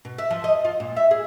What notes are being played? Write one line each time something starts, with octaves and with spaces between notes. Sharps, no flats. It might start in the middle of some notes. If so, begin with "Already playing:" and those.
B2
E5
F3
D#5
F4
A#2
E5
G#4